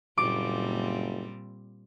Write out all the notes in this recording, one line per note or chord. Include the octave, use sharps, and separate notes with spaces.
F#1 A#2 G3 C4 D6